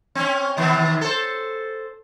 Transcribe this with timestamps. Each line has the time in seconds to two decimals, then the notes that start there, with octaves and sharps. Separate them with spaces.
0.15 C4 C#4
0.57 C3 D#3 B3
1.01 A4 C5